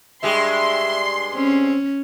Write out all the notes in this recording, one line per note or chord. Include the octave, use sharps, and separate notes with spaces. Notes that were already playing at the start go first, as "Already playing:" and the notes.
G2 G#3 G4 E5 C6
C4 C#4